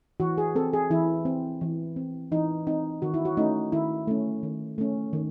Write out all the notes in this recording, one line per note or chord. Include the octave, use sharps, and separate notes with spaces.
E3 F#4
G#4
C4 A4
G#4
E3 E4
C4
E3
C4
E3 D#4
C4 D#4
D#3 F#4
E4
F#4
A3 C#4 D#4
D#3 E4
A3 C#4
D#3
A3 C#4
D#3